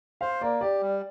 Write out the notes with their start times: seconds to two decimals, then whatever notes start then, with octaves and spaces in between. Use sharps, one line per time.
0.21 C5 F5
0.41 A#3 D5
0.61 G4 D5
0.81 G3